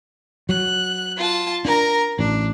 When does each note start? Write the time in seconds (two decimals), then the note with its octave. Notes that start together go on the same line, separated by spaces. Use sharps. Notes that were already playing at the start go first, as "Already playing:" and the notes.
0.49 F#3 F#6
1.18 F4 A5
1.65 D4 A#4 A#5
2.19 A1 D4